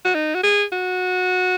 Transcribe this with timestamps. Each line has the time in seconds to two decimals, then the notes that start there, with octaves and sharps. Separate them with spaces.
0.05 F#4
0.15 D#4
0.35 F#4
0.43 G#4
0.73 F#4